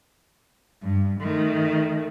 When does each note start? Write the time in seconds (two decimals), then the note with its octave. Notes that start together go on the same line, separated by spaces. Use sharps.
0.83 G2
1.21 D#3 A3